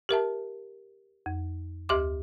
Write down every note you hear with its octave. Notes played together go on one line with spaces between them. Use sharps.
G4 A#4 E5 A5
F2
D2 G4 E5 C6 D6